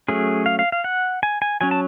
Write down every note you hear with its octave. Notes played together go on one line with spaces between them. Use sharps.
F#3 A3 C#4 G#4
F5
F5
F5
F#5
G#5
G#5
F#3 C#4 G#5
A5